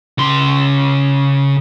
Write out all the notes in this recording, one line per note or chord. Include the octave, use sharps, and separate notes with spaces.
C#3 C6